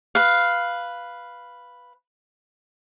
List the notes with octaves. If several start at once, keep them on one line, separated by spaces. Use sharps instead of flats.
B4 F5